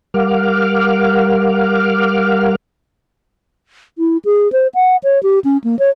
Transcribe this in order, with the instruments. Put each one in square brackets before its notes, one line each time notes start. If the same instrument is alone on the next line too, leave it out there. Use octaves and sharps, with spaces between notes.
[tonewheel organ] G3 A#4 F5 F#5 D6 F6
[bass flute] E4
G#4
C5
F#5
C#5
G4
C#4
A#3
C#5